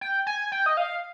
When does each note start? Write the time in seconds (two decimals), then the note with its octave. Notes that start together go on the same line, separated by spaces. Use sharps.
0.01 G5
0.27 G#5
0.52 G5
0.66 D#5
0.77 F5